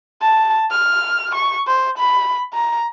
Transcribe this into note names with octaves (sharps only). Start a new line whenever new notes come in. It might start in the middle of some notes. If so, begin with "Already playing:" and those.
A5
F6
C#6
C5
B5
A#5